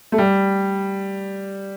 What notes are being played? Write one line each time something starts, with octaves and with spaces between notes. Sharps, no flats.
A3
G3